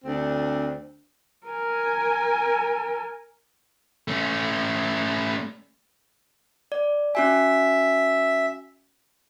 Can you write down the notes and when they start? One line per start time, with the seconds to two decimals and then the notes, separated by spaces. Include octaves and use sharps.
0.04 D2 C4 D4
1.47 A#4 G#5
4.08 A3 C#4
6.72 D5
7.15 C#4 F#4 E5 G#5